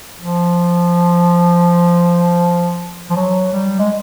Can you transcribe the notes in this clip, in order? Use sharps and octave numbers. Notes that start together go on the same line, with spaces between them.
F3
F3
F#3
G3
G#3